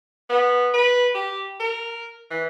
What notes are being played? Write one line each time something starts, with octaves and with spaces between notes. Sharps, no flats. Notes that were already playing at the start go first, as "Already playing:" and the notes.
B3
B4
G4
A#4
E3